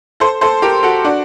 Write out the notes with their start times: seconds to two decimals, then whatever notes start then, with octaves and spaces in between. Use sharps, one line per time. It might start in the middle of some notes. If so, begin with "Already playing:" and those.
0.20 A4 C5
0.41 A4 C5
0.62 G4 A#4
0.83 F#4 A4
1.04 D4 F#4